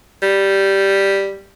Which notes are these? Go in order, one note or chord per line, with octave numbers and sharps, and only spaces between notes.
G3